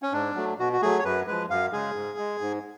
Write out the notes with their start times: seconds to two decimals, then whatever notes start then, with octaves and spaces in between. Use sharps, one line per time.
0.02 C#4
0.13 G#2 D4
0.35 F#3 A3
0.59 B2 F#4
0.73 F#4
0.82 F#3 A3 G#4
0.99 C#5
1.05 F#2 B4
1.27 F3 G#3 B4
1.50 F#2 F5
1.72 C#3 G#3 G#4
1.96 G#2
2.18 G#3
2.41 G#2